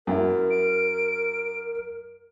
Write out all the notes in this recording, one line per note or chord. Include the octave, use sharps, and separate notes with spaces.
F#2 E4 A#4
D7